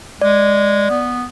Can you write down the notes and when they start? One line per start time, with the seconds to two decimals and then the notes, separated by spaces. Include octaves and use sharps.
0.21 G#3 D5
0.90 B3